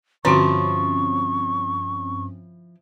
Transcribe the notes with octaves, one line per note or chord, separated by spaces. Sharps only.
G2 D3 F3 C4 C#4 E4 F#4 C#6